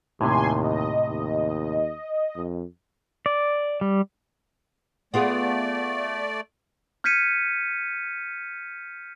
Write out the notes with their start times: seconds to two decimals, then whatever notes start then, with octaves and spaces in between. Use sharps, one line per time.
0.21 D#2 A2 C3 G#5 C6
0.64 D#5
1.08 D#2
2.36 F2
3.26 D5
3.81 G3
5.14 A3 B3 F4 G#4 D5
7.04 F6 G6 G#6 B6 C#7 D#7